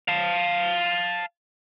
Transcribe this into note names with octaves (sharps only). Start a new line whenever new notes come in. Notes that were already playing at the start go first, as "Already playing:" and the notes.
F5 A5